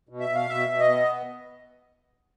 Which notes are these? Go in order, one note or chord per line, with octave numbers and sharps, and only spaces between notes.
B2
E5
B2
F5
B2 E5
B2
D#5
B3